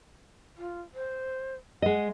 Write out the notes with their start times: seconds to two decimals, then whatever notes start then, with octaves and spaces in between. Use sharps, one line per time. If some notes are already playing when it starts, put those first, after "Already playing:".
0.58 F4
0.94 C5
1.82 G#3 D#5 F#5